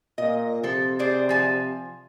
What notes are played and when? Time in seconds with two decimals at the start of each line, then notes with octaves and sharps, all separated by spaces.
0.18 A#2 D#5
0.63 C3 F3 A4
0.99 G#4 C5 D5
1.29 F3 G#5 A5